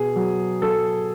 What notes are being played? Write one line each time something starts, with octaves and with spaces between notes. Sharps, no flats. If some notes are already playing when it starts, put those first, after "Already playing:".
Already playing: B2 G#4
F#3
F#3 A4